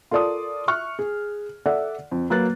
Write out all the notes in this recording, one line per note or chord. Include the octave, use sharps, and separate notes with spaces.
F4 A4 A#4 D5 A5 D#6
E5 C#6 F6 F#6
G#4
A4 D5 E5 F#5
F2
F#3 A#3 B4 F#6 A6